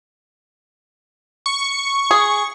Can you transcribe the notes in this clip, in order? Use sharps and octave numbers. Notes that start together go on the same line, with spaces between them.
C#6
G#4